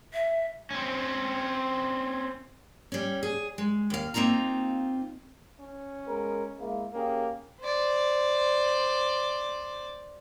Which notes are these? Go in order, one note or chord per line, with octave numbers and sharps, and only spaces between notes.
E5
C4 C#4
G3 C#4
G#4
G#3
D#2 F5
A#3 C4 D#4 F4 A#5
C#4
G#3 B3 A#4
G#3 A#3 E4
A#3 C#4 G4 G#4
C5 D5